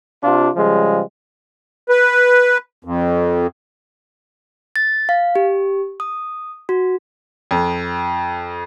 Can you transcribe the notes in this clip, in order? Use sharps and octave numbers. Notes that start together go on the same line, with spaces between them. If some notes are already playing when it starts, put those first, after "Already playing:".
C3 D4 F4
C#3 F3 G3 G#3
B4
F2
A6
F5
G4
D#6
F#4
F2